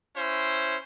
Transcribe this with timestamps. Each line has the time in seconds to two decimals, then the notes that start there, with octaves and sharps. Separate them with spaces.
0.17 C#4 E4 C5